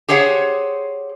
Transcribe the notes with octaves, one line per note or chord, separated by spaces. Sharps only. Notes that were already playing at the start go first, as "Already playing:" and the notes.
G4 G#4 C5 C#5 F#5